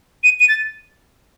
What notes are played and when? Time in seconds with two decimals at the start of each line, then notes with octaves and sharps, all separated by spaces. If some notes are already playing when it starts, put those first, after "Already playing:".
0.24 D#7
0.40 D#7
0.49 A6